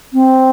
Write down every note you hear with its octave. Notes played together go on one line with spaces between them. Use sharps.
C4